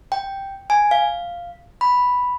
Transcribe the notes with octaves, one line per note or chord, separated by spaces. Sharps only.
G5
G#5
F5
B5